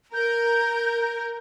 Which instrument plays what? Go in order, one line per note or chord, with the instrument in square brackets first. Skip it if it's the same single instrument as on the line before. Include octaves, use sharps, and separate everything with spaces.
[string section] A#4 [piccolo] G6